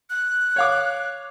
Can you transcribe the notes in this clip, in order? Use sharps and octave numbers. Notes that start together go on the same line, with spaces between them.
F#6
C#5 F5 D6